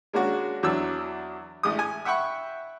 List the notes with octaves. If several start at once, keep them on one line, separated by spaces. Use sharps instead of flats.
G#3 A#3 C#4 D4 F#4
E2 F#3 D4 E6
A1 G#3 D#6
G#5
E5 F#5 G5 B5 C#6